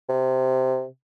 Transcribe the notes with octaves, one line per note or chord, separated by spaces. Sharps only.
C3